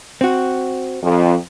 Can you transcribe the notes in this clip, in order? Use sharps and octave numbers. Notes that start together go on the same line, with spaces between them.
C4 F#4
F2